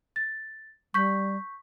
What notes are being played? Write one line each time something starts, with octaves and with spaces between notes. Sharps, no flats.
A6
G3 C#6 G6 B6